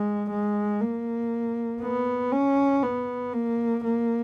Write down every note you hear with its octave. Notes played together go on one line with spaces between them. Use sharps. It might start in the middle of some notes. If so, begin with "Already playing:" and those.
Already playing: G#3
G#3
A#3
B3
C#4
B3
A#3
A#3